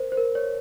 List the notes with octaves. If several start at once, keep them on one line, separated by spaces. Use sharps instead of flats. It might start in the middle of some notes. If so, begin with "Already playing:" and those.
Already playing: A#4 C5
C5
A#4
C#5